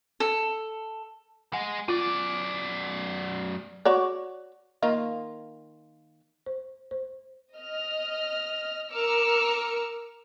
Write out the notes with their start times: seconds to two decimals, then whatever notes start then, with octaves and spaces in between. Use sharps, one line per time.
0.20 A4
1.53 G#3 F#5
1.88 F#2 F4 D5
3.85 F#4 C#5 D5
4.83 D#3 A#3 F4
6.46 C5
6.91 C5
7.55 D#5 F6
8.93 A#4 D6 E6 F6 C#7